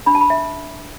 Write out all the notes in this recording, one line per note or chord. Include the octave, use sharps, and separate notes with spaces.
D4 B5
A5
B5
E5